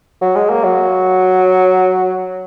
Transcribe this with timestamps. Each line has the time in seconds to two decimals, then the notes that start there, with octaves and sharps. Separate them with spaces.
0.21 F#3
0.35 G#3
0.50 A#3
0.64 F#3